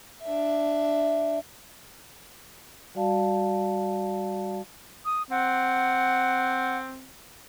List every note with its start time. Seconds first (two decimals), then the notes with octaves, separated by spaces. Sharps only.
0.23 D4 E5
2.95 G3 F#4 D5 F5 A5
5.05 D#6
5.31 C4 F#5